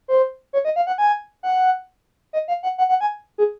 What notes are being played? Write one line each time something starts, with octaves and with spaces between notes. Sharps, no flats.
C5
C#5
D#5
F5
F#5
G#5
F#5
D#5
F5
F#5
F#5
F#5
G#5
G#4